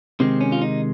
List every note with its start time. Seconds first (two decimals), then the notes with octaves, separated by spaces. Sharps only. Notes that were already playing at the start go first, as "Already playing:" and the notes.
0.20 C3 D#3 G#3 C4
0.41 C#4
0.52 F4
0.62 D#4